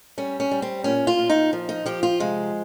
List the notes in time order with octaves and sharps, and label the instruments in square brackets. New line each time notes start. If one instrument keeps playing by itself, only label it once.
[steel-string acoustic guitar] G3 C#4
C#4
G3
C4
A#2 C#4
F4
A#2
D#4
F3
D#4
F3 G4
F4
C3 G#3